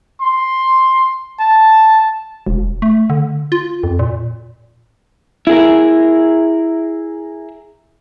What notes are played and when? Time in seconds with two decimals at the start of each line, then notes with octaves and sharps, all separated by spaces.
0.21 C6
1.40 A5
2.47 E1
2.82 A3
3.10 D3
3.52 F4
3.83 F2
3.99 A#2
5.47 E4 G#4 A#4